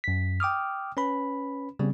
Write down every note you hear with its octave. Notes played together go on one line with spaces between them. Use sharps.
F#2 B6
G5 D6 D#6 F6
C#4 B4 B5
C#3 G3 B3 C4